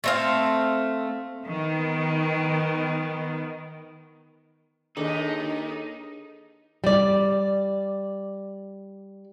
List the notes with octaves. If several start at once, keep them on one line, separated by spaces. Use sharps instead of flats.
A3 C4 F5
D#3 B3
D#2 D4 D#4 G#4 A4 D#5
G3 D5